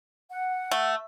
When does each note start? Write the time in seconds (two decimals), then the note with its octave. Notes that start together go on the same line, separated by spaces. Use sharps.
0.30 F#5
0.71 A3